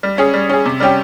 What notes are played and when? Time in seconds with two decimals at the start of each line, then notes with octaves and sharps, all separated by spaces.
0.03 G3
0.18 C#4 G#4
0.34 G3
0.49 C#4 G#4
0.65 C3
0.80 G3 C#4 G4